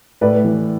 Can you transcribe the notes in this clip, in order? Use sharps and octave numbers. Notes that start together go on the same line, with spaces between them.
A2 B4 D5
E3